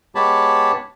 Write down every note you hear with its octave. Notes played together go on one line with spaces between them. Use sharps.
G#3 B3 G4 C#5 A5 B5